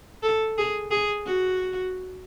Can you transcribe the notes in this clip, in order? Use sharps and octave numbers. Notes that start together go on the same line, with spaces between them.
A4
G#4
G#4
F#4